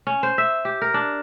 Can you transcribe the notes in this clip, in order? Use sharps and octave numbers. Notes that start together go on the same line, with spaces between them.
C#4
C5
E5
G4
A#4
D4